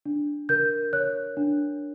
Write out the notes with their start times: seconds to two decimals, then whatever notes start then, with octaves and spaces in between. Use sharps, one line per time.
0.06 D4
0.49 A#4 G6
0.93 C#5 F#6
1.37 D4